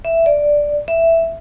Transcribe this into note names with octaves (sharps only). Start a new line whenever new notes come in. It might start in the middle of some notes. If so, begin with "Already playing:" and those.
E5
D5
E5